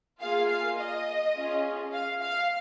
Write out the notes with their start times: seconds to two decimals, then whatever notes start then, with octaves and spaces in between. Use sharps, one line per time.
0.20 A#3 F4 G#4 F5
0.49 F5
0.77 D#5
1.35 C#4 F4 G#4
1.92 F5
2.21 F5